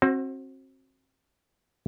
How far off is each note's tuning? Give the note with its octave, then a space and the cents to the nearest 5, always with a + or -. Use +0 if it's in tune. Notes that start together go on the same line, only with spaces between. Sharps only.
C4 +30 F#4 +0 C5 +0